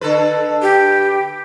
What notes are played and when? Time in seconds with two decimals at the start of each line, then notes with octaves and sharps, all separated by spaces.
0.01 D3 A4 B4
0.62 G4